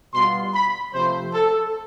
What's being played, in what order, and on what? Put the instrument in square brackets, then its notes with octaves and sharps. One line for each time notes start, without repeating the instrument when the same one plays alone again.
[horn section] B2 G3 B3 F4 C6
B5
C3 F3 A3 C5
A4